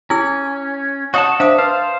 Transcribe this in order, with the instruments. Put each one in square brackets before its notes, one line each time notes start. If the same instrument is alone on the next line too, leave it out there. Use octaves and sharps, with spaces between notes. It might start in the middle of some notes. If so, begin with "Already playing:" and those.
[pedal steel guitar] C#4 [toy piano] E4 G#4 E6
[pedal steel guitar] F#4 F#5 A5 [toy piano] C#5 D#5 D#6
[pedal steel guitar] D4 E5 [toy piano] C5 F5 D#6
[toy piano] B4 [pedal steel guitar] C5 F5 A5